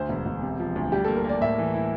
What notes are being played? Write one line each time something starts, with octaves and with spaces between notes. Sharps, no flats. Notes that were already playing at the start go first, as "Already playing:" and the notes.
Already playing: D2 C5
E1
E1
C3
F3
D2
G3 G4
A#3 A4
A#4
A#3 D5
A2 E5
E3
E4